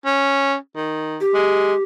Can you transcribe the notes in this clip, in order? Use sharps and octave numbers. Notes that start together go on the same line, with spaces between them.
C#4
D#3
G4
G#3